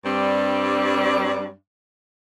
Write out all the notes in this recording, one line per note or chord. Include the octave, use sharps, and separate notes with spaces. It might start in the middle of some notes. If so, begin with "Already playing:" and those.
G2 G3 C4 D4